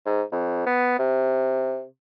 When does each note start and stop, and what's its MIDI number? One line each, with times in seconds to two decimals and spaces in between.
0.06 0.22 44
0.32 0.66 41
0.66 0.98 59
0.99 1.84 48